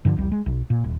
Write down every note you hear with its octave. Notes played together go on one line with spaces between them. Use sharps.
G2 D3 D#3 F3
E1 C2 G3
G#3
B1
A#2
D#1